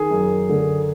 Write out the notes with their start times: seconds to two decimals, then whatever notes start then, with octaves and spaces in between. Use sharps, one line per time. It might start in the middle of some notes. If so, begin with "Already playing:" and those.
Already playing: D#3 G#4
0.11 F#2
0.49 D3